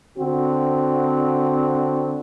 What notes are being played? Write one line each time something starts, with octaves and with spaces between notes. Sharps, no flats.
D3 C4 F#4